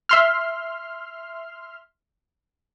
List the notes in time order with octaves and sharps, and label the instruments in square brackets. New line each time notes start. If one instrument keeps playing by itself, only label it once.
[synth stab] E5 C6 F6